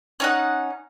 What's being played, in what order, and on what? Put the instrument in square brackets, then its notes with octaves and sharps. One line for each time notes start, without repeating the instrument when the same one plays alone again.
[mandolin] C#4 D#4 F#5